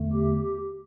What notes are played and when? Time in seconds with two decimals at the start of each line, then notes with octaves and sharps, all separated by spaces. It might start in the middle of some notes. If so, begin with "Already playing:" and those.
Already playing: E2 D3 A3
0.12 G4